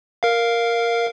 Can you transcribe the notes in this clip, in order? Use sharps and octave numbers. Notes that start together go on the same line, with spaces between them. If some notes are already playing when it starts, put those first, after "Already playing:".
A#4 F5